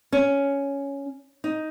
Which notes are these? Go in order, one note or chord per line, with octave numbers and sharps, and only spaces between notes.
C#4
D#4